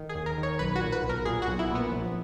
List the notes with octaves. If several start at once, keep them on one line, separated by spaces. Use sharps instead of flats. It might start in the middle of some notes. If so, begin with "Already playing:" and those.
Already playing: D#3
G#4
D#2
A#4
D#3
C#5
B1 B4
F#4
A#2
B4
B1
A#4
A#2 G#4
F#4
B1
E4
A#2 B3
A#1